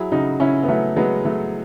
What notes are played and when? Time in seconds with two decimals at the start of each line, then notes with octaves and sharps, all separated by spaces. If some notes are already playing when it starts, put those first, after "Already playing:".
Already playing: F#3 E4 G#4
0.12 C#3 D#4 F#4
0.40 C#3 C#4 E4
0.63 B3
0.68 F#3 A3 C#4
0.96 F#3 G#3 B3
1.25 F#3 A3